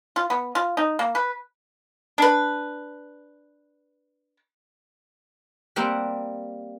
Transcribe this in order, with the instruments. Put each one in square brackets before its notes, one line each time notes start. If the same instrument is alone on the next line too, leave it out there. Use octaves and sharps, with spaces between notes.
[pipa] F4
B3
F4
D#4
A#3
B4
D4 B4
[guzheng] G3 A#3 C4 F#5